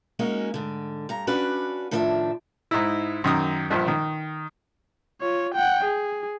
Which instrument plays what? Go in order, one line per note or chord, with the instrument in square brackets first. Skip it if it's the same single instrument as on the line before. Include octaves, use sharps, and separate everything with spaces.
[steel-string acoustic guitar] G#3 A#3 C#4 D#4 F#4
G#2 D3
G2 A#5
C#4 D4 F#4 B4 D5 F5
A2 D#3 F3 D4 B4 E5
[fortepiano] G#2 D#4 E4
F#2 D#3 D#6
A#1 G2 F3
D#3
[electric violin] F4 C#5
F#5 G5
G#4